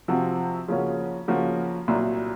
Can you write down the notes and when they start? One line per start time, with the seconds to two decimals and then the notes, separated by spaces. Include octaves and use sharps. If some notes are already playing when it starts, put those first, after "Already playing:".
0.08 C3 F3 C4 F#4
0.68 C#3 F3 A#3 C#4 F#4
1.28 C#3 F3 A#3 C#4 F#4
1.88 C2 A#2 F#3 A#3